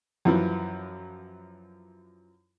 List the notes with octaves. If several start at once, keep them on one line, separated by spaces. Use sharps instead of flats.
F#2 E3 F3